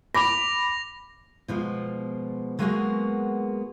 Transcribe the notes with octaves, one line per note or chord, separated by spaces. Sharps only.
B5 D6 A#6 F7
B2 F3 G#3
F#3 G#3 A#3 B3 F#4 G#4